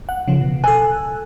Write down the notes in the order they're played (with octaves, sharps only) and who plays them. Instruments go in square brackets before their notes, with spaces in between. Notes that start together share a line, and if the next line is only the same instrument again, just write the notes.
[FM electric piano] F#5
C#3 F3
B2
[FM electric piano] A4 E6 F#6 [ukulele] G#5